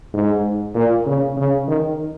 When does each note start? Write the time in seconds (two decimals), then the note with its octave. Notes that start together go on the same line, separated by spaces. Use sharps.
0.14 G#2
0.75 A#2
1.06 C#3
1.37 C#3
1.68 D#3